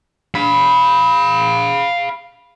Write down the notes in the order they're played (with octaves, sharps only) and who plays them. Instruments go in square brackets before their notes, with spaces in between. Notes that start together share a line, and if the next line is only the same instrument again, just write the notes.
[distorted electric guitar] F5 B5